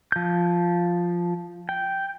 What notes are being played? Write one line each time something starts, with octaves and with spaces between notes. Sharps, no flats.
F3 G6
G5